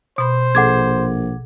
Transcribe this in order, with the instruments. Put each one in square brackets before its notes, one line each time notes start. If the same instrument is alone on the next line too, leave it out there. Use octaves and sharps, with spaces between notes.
[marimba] B2 B5 [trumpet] C5
[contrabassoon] A#1 [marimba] G#4 A4 [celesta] F#5 D6 G#6